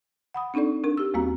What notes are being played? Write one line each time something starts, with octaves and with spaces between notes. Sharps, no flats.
F#5 B5 D#6
C4 D4 D#4 A4 D5
D4 A#4
G4 E6
D#2 G3 A#3 C4 F#4 A#5